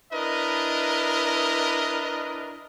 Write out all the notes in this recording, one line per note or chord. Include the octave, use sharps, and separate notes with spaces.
D4 E4 A#4 B4 D#5